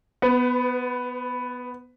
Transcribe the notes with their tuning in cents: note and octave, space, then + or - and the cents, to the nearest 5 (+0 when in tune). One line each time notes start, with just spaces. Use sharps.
B3 +0 B4 +40